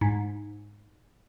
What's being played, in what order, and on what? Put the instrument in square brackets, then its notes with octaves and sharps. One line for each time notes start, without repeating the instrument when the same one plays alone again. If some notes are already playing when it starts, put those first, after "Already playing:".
[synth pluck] G#2